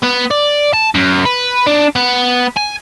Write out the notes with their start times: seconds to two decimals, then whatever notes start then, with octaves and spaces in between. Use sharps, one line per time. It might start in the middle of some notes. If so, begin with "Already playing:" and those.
0.03 B3
0.31 D5
0.74 A5
0.95 F#2
1.25 B4
1.67 D4
1.96 B3
2.57 G#5